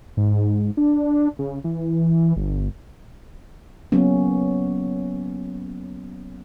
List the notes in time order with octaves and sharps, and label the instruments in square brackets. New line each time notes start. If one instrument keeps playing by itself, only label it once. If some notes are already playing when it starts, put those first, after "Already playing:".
[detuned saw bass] G#2
D4
C#3
E3
G1
[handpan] F#3 A#3 B3 C#4